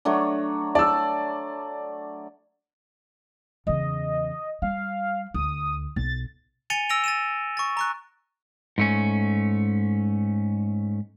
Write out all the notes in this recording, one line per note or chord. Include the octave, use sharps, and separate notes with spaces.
F#3 A3 D4
D5 A5 E6
E2 C#3 D#5
G3 F5
D2 D#6
B1 A6
G#5 A6 C#7 D#7 F7 G7
E6 A#6 D7 F7
A6 D#7 E7
C#6 A6
A#5 C#6 F#6
G#2 A3 C#4